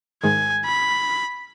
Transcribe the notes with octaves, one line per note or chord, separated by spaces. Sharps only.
G#2 D#3 G#3 G#5
B5